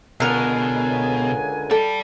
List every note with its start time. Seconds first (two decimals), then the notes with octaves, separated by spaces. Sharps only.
0.20 C#2 B2 D3 A#4 G#5
1.71 A4 D5 G5